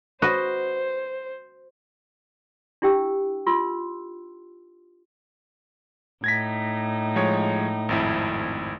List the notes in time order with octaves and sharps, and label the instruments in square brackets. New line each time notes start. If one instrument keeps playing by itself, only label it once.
[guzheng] F#4 B4 D#5 [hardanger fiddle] C5
[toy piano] D4 E4 G4 G5 E6
F4 C6 E6
[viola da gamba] A2 D#4 [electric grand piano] G#6 A#6 B6
[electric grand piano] F3 G#3 C#5
G#1 F2 E4